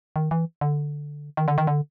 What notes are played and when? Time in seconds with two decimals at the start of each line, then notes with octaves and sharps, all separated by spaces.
0.16 D#3
0.31 E3
0.61 D3
1.37 D#3
1.48 D3
1.58 D#3
1.67 D3